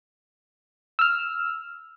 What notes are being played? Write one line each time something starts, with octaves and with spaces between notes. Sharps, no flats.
E6 F6